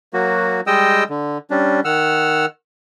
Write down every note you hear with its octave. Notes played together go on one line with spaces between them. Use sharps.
F#3 A#3 F#4
G3 G#3 D#5 G5 D#6 E6
D3
G3 C#4 D4
D#3 F#5 E6 F6